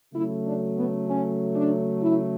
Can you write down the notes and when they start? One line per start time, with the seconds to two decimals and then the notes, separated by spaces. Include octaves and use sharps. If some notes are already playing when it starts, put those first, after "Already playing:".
0.14 C#3 F#3 A3 E4
0.46 D4
0.76 B3
1.08 C#4
1.56 D4
2.02 E4